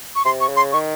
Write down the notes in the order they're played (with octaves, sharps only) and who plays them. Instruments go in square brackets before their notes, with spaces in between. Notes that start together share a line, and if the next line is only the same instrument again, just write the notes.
[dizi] C#6
[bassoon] C3 [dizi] C6
[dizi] C#6
[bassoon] C#3
[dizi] C6
[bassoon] D#3 [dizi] C#6